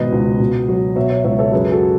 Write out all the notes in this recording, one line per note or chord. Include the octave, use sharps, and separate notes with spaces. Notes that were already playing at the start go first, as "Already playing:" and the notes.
Already playing: G#1 B2 B4 D#5
C#2
B2
F#3
B2 C#5 E5
C#5 E5
C#2 C#5 E5
A4 C#5
F#2 G#4 B4
F#4 A4